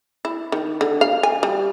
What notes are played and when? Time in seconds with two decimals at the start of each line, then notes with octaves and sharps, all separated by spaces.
0.25 E4
0.52 D#3
0.81 D3
1.01 F5
1.23 G#5
1.43 G3